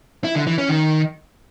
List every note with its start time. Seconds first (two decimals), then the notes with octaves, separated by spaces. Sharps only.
0.24 E4
0.36 D3
0.47 E3
0.58 C#4
0.69 D#3